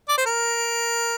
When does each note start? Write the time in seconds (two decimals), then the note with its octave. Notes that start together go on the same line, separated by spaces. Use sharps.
0.09 D5
0.18 C5
0.26 A#4